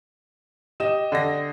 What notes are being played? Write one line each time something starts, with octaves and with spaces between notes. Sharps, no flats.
G4 D#5 E7
D3 A#6